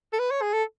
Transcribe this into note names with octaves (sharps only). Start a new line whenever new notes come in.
A4
B4
C#5
G#4
A4